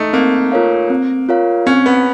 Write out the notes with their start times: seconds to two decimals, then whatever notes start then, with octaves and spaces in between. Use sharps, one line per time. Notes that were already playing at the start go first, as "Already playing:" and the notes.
Already playing: A3 D#4
0.13 A#3 C4
0.52 F4 A#4 C#5 F5
0.90 C4
1.29 F4 A#4 C#5 F5
1.66 C4 C#4
1.86 B3